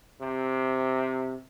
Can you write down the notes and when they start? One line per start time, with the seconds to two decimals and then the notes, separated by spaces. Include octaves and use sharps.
0.22 C3